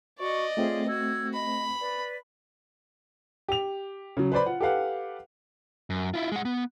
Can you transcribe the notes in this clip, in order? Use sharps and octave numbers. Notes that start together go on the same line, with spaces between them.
F#4 D5 D#5 C#6
A3 C4 F4 G#4 C#5
F#4 E6 G#6
D#5 B5
B4 D5
G4 F7
C#3 F#3
B4 C5 D5 B5
F4 F#5
G4 A4 B4 F5 F#5
F#2
E4 F4
G#3 F#5
B3